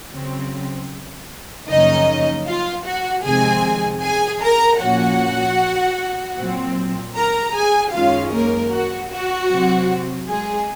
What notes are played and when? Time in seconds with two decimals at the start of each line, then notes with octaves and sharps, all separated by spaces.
0.12 C#3 F#3 C4
1.68 F#2 C#3 F3 A#3 C#4 D#4 D#5
2.47 F4 F5
2.85 F#4 F#5
3.25 F2 C3 D#3 G#3 C4 G#4 G#5
4.03 G#4 G#5
4.42 A#4 A#5
4.81 A#2 F3 A#3 C#4 F#4 F#5
6.38 A#2 F#3 C4
7.16 A#4 A#5
7.55 G#4 G#5
7.94 F#2 D#3 G#3 C#4 F4 F5
8.33 A#3 A#4
8.73 F#4
9.12 F#4
9.51 C3 F#3 C4
10.29 G#3 G#4